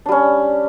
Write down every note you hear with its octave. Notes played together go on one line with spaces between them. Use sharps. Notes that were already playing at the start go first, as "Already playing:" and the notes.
G3 C#4 D4